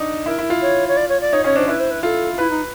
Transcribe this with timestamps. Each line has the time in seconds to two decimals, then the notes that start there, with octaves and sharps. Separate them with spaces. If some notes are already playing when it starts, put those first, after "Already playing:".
Already playing: D4 D#4
0.26 E4 A#4
0.38 E4
0.50 F4
0.61 C#5
0.88 C#5
0.96 D5
1.09 C#5
1.21 D5
1.33 D#4 C#5
1.44 C#4 C#5
1.56 D4 C5
1.68 E4 B4
1.79 C5
1.90 B4
2.03 F4 A4
2.38 E4 B4
2.50 D#4